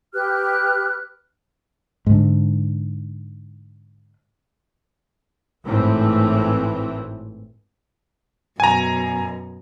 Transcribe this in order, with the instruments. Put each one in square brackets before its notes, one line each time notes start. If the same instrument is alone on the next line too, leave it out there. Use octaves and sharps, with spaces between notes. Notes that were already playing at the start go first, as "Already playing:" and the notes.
[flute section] G4 B4 F6 F#6
[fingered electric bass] G#2 D3
[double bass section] G#1 A2 E3 C4
[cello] F#2 B2 [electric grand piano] G#5 A#5